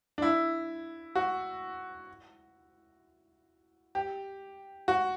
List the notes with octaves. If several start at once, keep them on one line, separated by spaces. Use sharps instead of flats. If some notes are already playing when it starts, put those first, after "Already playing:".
D4
E4
F#4
G4
F#4